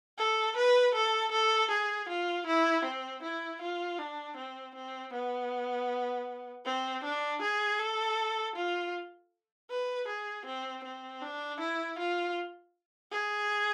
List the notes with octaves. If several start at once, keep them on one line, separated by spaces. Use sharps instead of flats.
A4
B4
A4
A4
G#4
F4
E4
C4
E4
F4
D4
C4
C4
B3
C4
D4
G#4
A4
F4
B4
G#4
C4
C4
D4
E4
F4
G#4